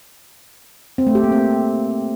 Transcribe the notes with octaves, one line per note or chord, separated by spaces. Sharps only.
C4
A3
G4
A#3
C4